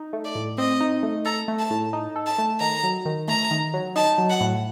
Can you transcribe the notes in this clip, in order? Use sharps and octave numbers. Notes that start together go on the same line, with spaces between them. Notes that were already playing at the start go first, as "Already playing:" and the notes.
Already playing: D#4
A3
D5
A2
C4 D#5
D#4
A3
A4 A#5
A3
A5
A2
D#4
A4
A5
A3
D#3 A#5
F#3
D#3
A3 A#5
D#3
F#3
D#4 A5
F#3
F#5
A2